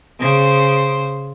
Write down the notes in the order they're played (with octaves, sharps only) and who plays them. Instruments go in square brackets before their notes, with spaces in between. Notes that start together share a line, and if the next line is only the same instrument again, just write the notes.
[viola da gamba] C#3 C5